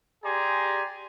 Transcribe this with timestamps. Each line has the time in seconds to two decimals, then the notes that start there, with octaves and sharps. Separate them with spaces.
0.24 G4 G#4 D5 G#5 A#5 C6